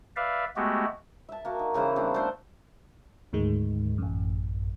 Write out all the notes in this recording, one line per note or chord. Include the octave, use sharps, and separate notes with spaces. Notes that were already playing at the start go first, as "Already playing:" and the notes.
B4 D5 E5 F5
G#3 A3 B3 F#4 G4
E5 A5
A#3 F#4
D#3
C#3 E3 A#3 C5
G3 B3 C4 D4
A3 D4 C5
D2 G#2 D#3 G#3
A1 F#2